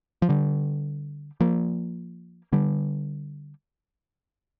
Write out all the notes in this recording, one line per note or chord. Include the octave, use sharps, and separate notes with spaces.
F3
D3 G3
F3 A#3
D3 G3